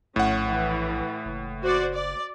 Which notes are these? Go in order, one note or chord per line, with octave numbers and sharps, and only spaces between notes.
A#1 A2 C#4 F#5
E3
F#1
F#4 C5 D5
D5